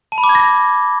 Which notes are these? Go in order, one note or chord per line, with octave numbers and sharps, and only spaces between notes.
A5
B5
D6
G#6
A#6